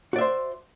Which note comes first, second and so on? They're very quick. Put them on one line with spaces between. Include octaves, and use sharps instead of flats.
F#4 D5 E5 C5